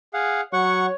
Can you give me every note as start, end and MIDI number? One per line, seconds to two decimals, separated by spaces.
0.14 0.41 68
0.14 0.41 77
0.14 0.41 78
0.53 0.88 54
0.53 0.95 73
0.53 0.86 78
0.53 0.86 85